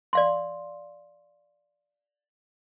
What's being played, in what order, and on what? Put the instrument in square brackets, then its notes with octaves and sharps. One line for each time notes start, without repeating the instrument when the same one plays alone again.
[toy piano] D5 F5 C6